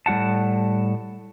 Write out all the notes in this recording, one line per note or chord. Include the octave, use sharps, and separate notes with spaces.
A2 G3 F#4 F#5 A5